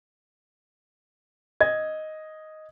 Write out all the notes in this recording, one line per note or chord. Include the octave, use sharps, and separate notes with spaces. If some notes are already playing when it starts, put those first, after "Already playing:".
D#5 G#6